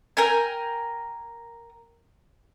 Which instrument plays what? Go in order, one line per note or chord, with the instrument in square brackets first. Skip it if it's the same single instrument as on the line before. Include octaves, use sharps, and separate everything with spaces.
[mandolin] A#4 G5 G#5